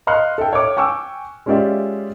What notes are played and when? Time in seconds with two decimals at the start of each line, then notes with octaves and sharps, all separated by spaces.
0.07 D#5 F5 C6 F6 F#6 C#7
0.38 A4 E5 G5
0.53 C#5 D6
0.77 G5 G#5 C#6 D6 E6
1.46 G#3 C#4 F4 G4 D5 E5